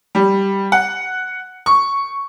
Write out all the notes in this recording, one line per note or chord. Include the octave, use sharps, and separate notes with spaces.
G3
F#5
C#6